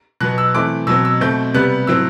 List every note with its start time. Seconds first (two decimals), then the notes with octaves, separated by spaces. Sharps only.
0.20 B2 F#3 B3 F#6
0.38 E6
0.55 E3 A3 C4 D6
0.87 B2 F#3 C4 E6
1.05 E6
1.21 B2 A3 C4 G6
1.54 C3 G3 B3 F#6
1.87 A2 F#3 C4 E6